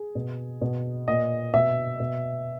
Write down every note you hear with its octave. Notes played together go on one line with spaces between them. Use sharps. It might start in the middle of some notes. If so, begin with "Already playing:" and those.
Already playing: G#4
B2
B2
A#2 D#5
B2 E5
B2